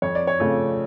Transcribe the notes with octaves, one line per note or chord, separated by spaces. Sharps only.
F2 C#5
D5
C#5
C#3 F3 A3 C#4